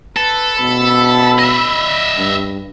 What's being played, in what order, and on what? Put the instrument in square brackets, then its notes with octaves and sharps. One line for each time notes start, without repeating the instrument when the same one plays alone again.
[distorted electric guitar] A4 [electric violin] B4
[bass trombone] B2 [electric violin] B5 E6
[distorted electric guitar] D#5 E5
[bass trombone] G2